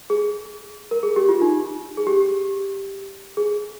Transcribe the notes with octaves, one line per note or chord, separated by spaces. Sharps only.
G#4
A#4
G#4
G4
F4
D#4
G#4
G4
G#4